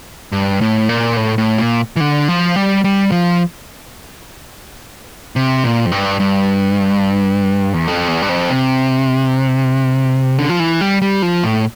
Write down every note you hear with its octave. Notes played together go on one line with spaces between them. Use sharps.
G2
A2
A#2
A2
A2
A#2
E3
D3
F3
G3
G3
F3
C3
A#2
F2
G2
G2
E2
F2
E2
G2
F2
C3
D3
F3
E3
G3
G3
F3
A2